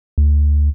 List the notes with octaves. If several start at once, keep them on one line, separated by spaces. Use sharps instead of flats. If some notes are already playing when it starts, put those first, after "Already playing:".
D2